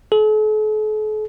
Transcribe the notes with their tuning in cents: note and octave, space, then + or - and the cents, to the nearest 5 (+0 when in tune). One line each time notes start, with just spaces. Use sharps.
A4 -45